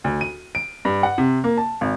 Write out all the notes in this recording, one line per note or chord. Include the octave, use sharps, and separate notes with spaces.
D2
D#7
D7
G2
F#5
C3
A#3
A5
G#1